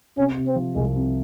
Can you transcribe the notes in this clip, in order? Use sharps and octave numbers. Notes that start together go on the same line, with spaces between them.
C3 C#4
C3
C4
F3
C2 G#3
C3